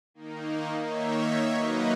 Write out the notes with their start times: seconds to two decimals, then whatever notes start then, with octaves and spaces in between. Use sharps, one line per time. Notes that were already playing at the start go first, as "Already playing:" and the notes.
0.14 D#3 A#3 D#4
0.82 D#3 A#3 D#4 C#5 E5
1.50 D#3 F#3 A#3 D#4 B4 D#5